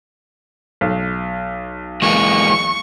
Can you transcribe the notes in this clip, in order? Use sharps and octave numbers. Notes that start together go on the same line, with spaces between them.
B1
E3 G#3 A#3 C#6